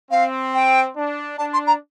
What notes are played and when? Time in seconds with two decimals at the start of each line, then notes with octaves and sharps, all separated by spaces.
0.11 C4 F5
0.54 G5
0.96 D4
1.38 D4 A5
1.53 C6
1.67 A#5